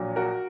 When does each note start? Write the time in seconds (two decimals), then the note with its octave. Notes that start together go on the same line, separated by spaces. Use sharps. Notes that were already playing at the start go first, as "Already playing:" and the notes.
Already playing: A#1 A#2 F#3
0.16 F#4 A#4